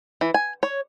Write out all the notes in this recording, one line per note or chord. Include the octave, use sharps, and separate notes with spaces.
E3
G#5
C#5